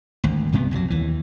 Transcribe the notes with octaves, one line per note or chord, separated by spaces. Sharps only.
G#1 D2
C2 G2 C3 B3
B1 F2 D#3 F#3
D#2 E3